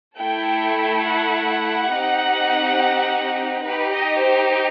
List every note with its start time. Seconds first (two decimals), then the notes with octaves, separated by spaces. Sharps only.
0.17 A3 E4 A4 G5
1.05 F#5
1.91 C4 D#4 G4
3.63 D#4 G4 B4
3.92 D#5
4.21 C5